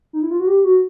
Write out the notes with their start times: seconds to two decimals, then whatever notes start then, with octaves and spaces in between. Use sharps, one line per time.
0.13 D#4
0.23 E4
0.31 F4
0.40 F#4
0.47 G4
0.64 F#4